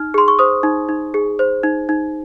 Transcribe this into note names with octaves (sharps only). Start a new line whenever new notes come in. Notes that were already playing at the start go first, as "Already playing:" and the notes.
Already playing: D#4 F6
G#4 C6
C#6
C5 D#6
D#4
D#4
G#4
C5
D#4
D#4